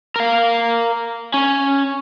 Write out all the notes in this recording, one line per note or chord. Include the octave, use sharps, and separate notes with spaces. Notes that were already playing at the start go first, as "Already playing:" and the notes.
A#4 F5
C#4